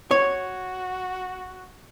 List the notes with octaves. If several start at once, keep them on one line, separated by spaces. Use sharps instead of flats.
F#4 C#5